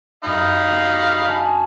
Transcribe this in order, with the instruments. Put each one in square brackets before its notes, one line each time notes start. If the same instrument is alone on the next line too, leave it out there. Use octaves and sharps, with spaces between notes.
[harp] F#2 G5 [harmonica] D#4 F5 B5
[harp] B3
C#4 G#5 A5